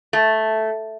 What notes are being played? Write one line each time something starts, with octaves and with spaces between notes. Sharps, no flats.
A3